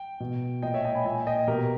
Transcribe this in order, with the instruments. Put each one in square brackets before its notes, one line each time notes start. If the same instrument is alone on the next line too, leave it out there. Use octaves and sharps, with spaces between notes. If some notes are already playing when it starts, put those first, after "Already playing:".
Already playing: [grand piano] G5
B2
A#2 D#5 G5
C#5 E5
D#5 G5
G#5 B5
A#2 E5 G#5
D#5 G5
B2 G4 A#4